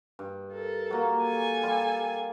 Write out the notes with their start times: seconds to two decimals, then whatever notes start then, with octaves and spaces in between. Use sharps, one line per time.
0.19 G2
0.53 A4 A#4
0.90 F#3 A#3
1.23 A4 G#5
1.63 G3 F4 D5